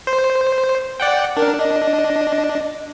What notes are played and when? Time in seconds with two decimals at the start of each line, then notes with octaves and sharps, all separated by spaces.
0.07 C5
1.00 D5 F#5 G5
1.37 D4 A#4
1.59 D#5